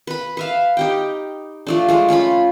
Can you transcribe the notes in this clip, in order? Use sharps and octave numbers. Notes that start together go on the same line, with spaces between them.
B4 B5
B4 E5 F5
D#4 G4 G5
F3 A3 D4
F3 G#3 A3
A3 C#4 F4 B5